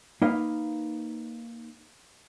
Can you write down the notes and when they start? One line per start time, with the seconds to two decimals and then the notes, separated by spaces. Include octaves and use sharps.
0.22 A#3 D#4 B4 F5